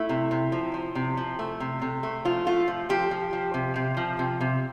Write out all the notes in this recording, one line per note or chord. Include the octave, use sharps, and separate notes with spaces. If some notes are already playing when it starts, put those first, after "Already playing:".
Already playing: A3 E4
C3
C3
F3
F3
C3
F3
A3
C3
C3
A3
F3 F4
A3 F4
F3
F3 G4
F3
F3
C3
C3
F3
C3
C3